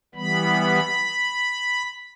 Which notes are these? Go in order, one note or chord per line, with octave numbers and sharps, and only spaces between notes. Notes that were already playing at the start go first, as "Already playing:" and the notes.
E3 G3 B3 B5